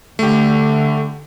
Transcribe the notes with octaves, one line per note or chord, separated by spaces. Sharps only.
D3 A3 G4